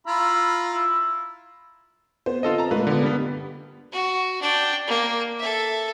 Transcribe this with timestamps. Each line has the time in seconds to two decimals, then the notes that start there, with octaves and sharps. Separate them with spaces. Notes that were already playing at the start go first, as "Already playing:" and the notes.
0.07 E4 F4 A#5 B5
0.73 E4
2.26 B3 C5
2.43 D3 C4 F4 A4 D#5
2.58 A5 A#5
2.71 A#2 G#3 A3 B4
2.87 D3 B3
3.03 G2 G3 B3
3.92 F#4
4.41 D4 G5
4.87 A#3
5.39 A4 E5